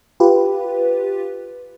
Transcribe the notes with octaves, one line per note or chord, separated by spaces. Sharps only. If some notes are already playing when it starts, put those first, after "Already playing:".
F4 G4 B4